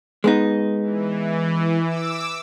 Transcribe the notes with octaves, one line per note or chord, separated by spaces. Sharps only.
G#3 B3 D#4
E3
D6 E6